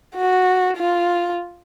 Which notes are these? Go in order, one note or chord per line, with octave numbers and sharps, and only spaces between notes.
F#4
F4